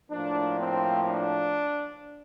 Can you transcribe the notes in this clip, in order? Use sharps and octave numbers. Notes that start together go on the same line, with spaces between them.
A2 F3 A#3 D4
C4
D4